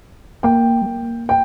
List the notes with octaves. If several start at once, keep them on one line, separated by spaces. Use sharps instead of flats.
A#3 G5
G3
A#3
G5